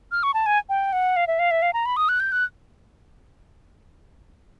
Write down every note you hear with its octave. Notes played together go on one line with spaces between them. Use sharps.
F6
C#6
A5
G#5
G5
F#5
F5
E5
F5
E5
F5
A#5
B5
D#6
F#6
G6
F#6